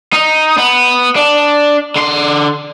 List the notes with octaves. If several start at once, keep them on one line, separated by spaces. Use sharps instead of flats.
D#4
B3
D4
D3 C6